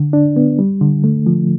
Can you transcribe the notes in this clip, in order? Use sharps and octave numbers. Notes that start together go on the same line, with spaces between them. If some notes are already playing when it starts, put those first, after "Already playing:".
Already playing: D3
D4
B3
G3
D3
A3
F3